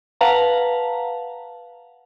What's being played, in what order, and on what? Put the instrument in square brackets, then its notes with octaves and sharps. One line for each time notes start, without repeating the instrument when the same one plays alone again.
[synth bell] B4 F5 F#5 A5 A#5